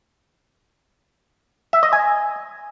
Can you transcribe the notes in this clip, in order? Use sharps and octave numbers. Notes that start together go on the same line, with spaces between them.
E5
D#5
G#5